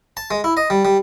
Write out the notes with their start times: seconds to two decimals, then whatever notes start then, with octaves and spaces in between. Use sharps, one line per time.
0.17 A5
0.31 G#3
0.44 E4
0.57 D#5
0.70 G3
0.85 G3